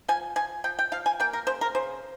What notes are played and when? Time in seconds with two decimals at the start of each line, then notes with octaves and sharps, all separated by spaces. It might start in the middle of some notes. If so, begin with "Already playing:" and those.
0.08 F3 G#5
0.36 F3 G#5
0.64 F3 G5
0.79 G5
0.92 F3 F5
1.06 G#5
1.20 A#3 G5
1.33 A#4
1.47 C#3 C5
1.61 A#4
1.75 C#3 C5